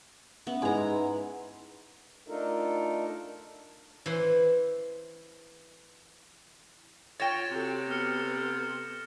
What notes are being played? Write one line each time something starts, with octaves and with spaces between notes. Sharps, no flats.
B3 C#4 E5
G#2 G#3 E4 B4 F#5 G#5 A#5 C6
A3 D4 D#4 F4 A4 A#4
E3 C5
F4 C#5 G5 A6 A#6 E7
C3 F#4 A4
B3 A4 F6 C#7